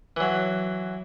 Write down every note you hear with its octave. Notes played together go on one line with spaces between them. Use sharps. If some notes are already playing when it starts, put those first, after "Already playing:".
E3 F#3